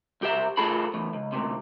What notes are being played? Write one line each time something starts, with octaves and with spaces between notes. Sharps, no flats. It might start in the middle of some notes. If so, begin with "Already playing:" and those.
C2 G4 E5
A2 F4 G#4 A4 B5
E2 A2
C#2
D2 C3